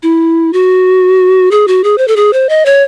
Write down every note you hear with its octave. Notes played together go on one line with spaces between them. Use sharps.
E4
F#4
G#4
F#4
G#4
C5
A4
G#4
C5
D#5
C#5